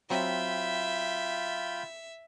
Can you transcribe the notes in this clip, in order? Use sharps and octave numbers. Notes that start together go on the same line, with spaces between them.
F#3 C4 F4 E5 G5 B5